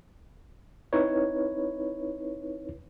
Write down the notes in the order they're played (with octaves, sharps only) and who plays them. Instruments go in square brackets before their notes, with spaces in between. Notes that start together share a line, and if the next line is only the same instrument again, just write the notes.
[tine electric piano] C4 D#4 E4 B4 C#5